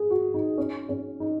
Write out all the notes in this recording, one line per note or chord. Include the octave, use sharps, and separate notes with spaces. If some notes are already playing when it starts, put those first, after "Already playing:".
Already playing: G#4
F#4
D#4
C#4
C#4
D#4